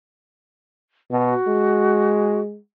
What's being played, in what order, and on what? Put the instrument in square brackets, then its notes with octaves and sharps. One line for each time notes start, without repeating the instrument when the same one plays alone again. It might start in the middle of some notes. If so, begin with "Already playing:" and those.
[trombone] B2 [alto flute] F#4
[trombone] G#3